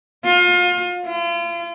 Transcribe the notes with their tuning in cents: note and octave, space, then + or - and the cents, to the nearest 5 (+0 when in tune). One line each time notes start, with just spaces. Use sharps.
F4 +30
F4 -40